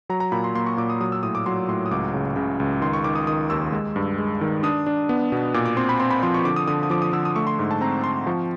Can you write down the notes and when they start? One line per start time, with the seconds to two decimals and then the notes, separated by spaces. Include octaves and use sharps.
0.09 F#3 A#5
0.20 A#5
0.32 A#2 B5
0.44 C6
0.55 A#3 C6
0.66 C#6
0.77 A#2 D6
0.90 D#6
1.00 F#3 D#6
1.12 E6
1.23 A2 D#6
1.35 D6
1.46 F#3 C6
1.68 A2 C6
1.86 D#6
1.91 C#2 D6
2.14 C#3
2.36 C#3
2.60 C#2
2.82 D#3 C6
2.93 C#6
3.04 D#3 D6
3.15 D#6
3.27 D#3 D#6
3.50 D#2 E6
3.72 G#3
3.96 G2
4.18 G#3
4.41 D#3
4.63 D4 D#6
4.86 D4
5.09 B3
5.32 B2
5.54 A#2 D6
5.66 D6
5.77 C4 C6
5.89 B5
6.00 C4 C6
6.11 B5
6.23 F3 C6
6.34 C#6
6.45 D3 D6
6.56 D#6
6.67 D3 D#6
6.83 D#6
6.90 F3 D6
7.02 D#6
7.13 D3 E6
7.25 D#6
7.36 A3 C#6
7.47 C6
7.59 G#2
7.71 A5
7.81 C4 A#5
8.03 C4 C6
8.27 F3 C#6